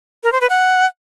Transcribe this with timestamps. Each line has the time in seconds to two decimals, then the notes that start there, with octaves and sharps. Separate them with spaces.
0.24 A#4
0.32 C5
0.41 B4
0.50 F#5